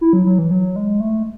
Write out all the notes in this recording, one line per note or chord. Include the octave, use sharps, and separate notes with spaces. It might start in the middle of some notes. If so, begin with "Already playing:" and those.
E4
F#3
F#3
E3
F#3
G#3
A3